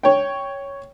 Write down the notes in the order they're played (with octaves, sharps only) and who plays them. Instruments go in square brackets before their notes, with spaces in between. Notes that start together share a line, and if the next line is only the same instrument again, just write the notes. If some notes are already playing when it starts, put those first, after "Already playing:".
[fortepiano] C#5 G5